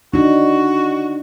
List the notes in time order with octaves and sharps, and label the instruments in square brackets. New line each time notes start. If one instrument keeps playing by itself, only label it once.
[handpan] D4 D#4 [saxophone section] F#4